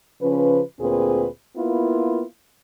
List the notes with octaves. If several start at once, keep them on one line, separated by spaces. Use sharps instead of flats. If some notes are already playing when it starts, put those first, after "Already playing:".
C#3 F3 C#4 B4
D2 A#2 C4 G#4 B4
A#3 B3 E4 F4